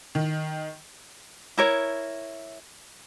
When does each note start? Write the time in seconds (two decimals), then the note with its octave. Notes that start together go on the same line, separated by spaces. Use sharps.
0.15 D#3
1.58 E4 A#4 C#5